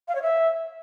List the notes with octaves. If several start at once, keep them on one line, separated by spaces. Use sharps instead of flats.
F5
C#5
E5